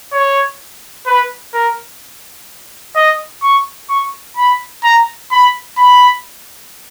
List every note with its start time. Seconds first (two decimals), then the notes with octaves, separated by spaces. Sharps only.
0.13 C#5
1.06 B4
1.54 A#4
2.95 D#5
3.42 C#6
3.89 C#6
4.37 B5
4.83 A#5
5.31 B5
5.78 B5